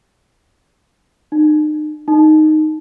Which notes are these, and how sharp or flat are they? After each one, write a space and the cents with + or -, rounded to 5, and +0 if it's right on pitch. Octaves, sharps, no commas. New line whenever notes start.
D#4 -35
D#4 -5